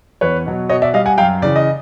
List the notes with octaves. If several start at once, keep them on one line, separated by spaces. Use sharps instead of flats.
E2 B4 C#5
B2 F#3
B2 C#5 D#5
D5 E5
G3 D#5 F5
F#5 G#5
F#2 F5 G5
C#3 E3 D5
D#5